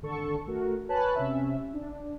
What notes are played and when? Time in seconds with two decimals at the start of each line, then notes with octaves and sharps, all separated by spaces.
0.02 G#1 D3 A4 C#6
0.47 A3 F#4 A#4
0.89 B4 C#5 G#5 A5 B5 F#6
1.15 C3 C#4 E5
1.73 D4